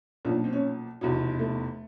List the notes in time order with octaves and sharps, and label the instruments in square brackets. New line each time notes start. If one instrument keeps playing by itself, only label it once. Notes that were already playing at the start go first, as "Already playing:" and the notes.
[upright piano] B1 A#2 F3 D4
C4
C#4
F1 E2 B2
A3